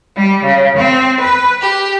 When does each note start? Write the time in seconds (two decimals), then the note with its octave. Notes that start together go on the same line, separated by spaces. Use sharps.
0.16 G3
0.45 C#3
0.76 C4
1.22 B4
1.60 G4